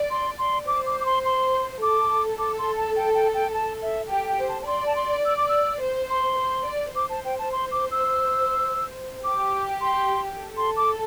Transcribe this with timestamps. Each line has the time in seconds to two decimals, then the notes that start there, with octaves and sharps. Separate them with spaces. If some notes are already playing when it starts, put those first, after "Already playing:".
Already playing: D5
0.11 C6
0.39 C6
0.67 C5 D6
0.86 D6
1.00 D6
1.06 C6
1.25 C6
1.82 A4 D6
2.39 D6
2.59 C6
2.77 A5
2.96 G5
3.14 G5
3.34 G5
3.53 A5
3.82 E5
4.10 G4 G5
4.29 G5
4.39 C5
4.49 A5
4.62 A5
4.67 D5 C6
4.86 A5
4.96 C6
5.25 E6
5.37 D6
5.49 E6
5.82 C5
6.10 C6
6.38 C5
6.66 D5
6.95 C5 D6
7.10 A5
7.25 G5
7.39 A5
7.52 C6
7.72 D6
7.91 E6
9.24 G4 D6
9.81 C6
10.39 A4
10.57 C6
10.77 D6